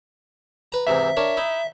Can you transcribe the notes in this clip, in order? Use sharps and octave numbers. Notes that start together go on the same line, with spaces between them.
B4 A#5
G#2 C3 E3 E5
D4 A#4 C#5
D#4 E4